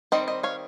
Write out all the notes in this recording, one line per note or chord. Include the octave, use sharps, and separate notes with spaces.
D#3 G3 C4 C5 D#5
C5 D#5
C#5 F5